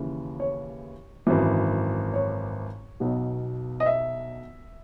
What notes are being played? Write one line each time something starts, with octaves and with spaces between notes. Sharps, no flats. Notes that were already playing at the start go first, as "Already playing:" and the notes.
Already playing: D#2 C#3 E3
C#5
G#1 F#2 E3
C#5
B1 B2 F#3
D#5
E5